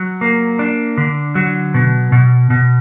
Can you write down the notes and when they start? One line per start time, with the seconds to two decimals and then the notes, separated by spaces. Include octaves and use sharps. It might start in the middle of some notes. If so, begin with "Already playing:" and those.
Already playing: F#3
0.21 A#3
0.59 D4
0.98 D3
1.35 F#3
1.74 B2
2.12 B2
2.50 B2